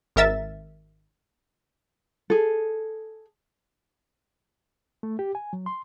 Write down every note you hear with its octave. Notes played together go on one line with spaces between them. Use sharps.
G#1 A#4 E5 A6
G#4 A4
A3
G4
G#5
F#3
C6